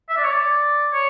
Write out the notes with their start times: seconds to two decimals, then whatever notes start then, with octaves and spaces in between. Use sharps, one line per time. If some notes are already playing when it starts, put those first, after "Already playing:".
0.09 E5
0.17 D5
0.24 C#5
0.32 D5
0.93 C#5